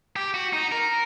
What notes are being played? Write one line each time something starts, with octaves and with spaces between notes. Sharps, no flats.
G4
F#4
D#4
A#4